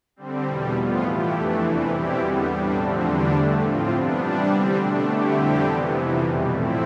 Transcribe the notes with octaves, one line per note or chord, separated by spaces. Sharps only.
D3 G3 C4
E2 B2 G3
A2 F3 B3 F4
E3 A3 E4 G4
F2 E3 A3 D4
E2 C3 E3
B2 G3 C4 E4 G4
E2 D3 G3 B3
A2 G3 D4
D3 F3 A3 C4
E2 D3 G3 D4
G2 D3 A3
A2 F3 C4 F4
C3 G3 B3 D4
E3 G3 D4
D3 G3 C4
B2 A3 D4
D3 A3 E4 G4
F2 D3 G3 C4 G4
C3 E3 B3
F2 C3 E3
E2 B2 G3
A2 F3 A3 C4 E4